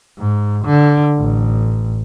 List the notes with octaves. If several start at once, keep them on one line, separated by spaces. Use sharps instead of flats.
G#2
D3
A1